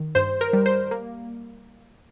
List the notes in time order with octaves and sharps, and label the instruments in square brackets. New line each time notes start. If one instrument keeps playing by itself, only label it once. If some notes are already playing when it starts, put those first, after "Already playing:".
Already playing: [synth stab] D#3
G2 C5
A#4
G3
C5
A#3